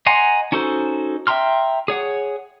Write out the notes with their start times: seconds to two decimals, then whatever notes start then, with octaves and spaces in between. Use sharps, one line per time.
0.06 D#5 F#5 G#5 A#5 C6
0.52 C#4 D#4 F#4 A4 C5
1.27 E5 G5 A#5 C6 F6
1.88 G#4 C#5 F#5